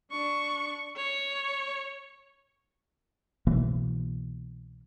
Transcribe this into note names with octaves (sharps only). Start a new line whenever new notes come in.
D4 C#6
C#5
C2 B2 E3 A#3